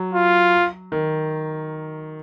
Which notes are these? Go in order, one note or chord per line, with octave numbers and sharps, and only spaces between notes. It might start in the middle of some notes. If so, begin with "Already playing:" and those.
Already playing: F#3
F4
D#3